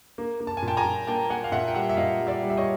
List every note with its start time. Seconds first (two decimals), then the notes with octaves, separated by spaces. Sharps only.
0.18 A#3
0.40 A#3
0.47 A5
0.57 G#5
0.62 A#2
0.68 G5 A5
0.77 G#5 A#5
0.85 A#2
1.07 A#3 G5 A5
1.30 A#3 F#5 G#5
1.44 F5
1.52 A#2 E5 F#5
1.68 G5
1.75 G3 E5 F#5
1.89 E5
1.97 A#2 D#5 F5
2.20 G3
2.27 D5 E5
2.43 G3
2.50 E5
2.57 C#5 D#5